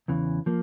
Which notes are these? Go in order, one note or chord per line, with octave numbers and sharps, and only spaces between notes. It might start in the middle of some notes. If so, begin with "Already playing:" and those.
E2 C#3 E3
F3 A#3